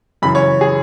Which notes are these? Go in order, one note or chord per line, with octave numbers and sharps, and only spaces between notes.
F#2 C#3 E3 B5
C#5
G#4